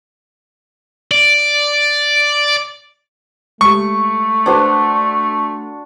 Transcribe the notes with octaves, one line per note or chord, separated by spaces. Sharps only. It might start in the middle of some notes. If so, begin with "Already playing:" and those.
D5
G#3 A3 G4 C#6
D4 F#4 B4 C5 C6